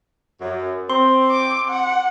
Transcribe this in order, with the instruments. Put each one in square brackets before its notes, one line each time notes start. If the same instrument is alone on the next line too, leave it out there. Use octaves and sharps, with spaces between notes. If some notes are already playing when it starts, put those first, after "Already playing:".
[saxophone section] F#2
[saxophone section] C4 [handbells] C6
[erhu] D6
F#5